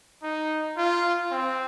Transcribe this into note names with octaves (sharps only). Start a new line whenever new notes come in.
D#4
F4
C4